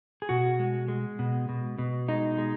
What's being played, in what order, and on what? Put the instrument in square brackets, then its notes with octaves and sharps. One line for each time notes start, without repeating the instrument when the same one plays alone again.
[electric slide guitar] G#4
B2 F#4
G#3
G#3
B2
B2
B2
G#3 D#4
G#3